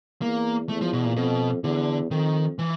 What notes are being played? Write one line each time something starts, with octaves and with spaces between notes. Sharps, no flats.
E2 A#3
E2 A3
F3
B2
A#2
F2 B2
E2 D3
F2 D#3
E3